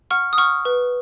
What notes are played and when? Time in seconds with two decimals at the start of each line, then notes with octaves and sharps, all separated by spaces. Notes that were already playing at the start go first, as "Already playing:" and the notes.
0.11 F#5 C#6 F6
0.33 D#6
0.38 F#5 C#6 F6
0.65 B4